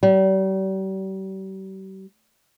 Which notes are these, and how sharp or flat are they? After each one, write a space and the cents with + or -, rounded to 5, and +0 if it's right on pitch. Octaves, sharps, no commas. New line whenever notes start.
G3 -40